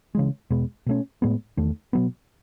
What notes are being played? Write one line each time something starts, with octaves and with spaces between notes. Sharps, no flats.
C#3 E3 G#3
E2 B2 G#3 B3
B2 A3 C#4
A2 G#3 B3
E2 D#3 A3
B2 F#3 B3